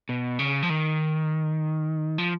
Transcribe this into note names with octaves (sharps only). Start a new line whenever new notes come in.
B2
C#3
F3
D#3
F3